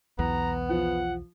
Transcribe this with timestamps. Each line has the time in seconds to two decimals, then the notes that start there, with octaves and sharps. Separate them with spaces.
0.19 B1 E2 E3 B3 A#5
0.69 F3 F#5